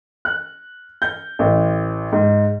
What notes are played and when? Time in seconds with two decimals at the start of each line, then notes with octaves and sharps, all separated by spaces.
0.25 F#6
1.02 G6
1.39 A1
2.12 G#2